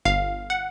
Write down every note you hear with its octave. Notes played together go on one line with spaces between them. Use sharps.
G1 F5
F#5